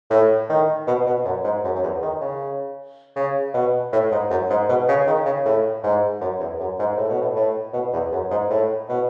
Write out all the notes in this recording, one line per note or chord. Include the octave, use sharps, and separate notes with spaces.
A2
D#3
B2
B2
F#2
G#2
F#2
F#2
E2
D#3
C#3
C#3
B2
A2
G#2
F#2
G#2
B2
C#3
D#3
C#3
A2
G#2
F#2
E2
F#2
G#2
A2
B2
A2
A2
B2
E2
F#2
G#2
A2
B2